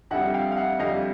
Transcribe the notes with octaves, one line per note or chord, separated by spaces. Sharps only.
F2 D3 G3 E5 F#5
F5 G5
F5
E5 F#5
F2 D3 G3 D#5 F5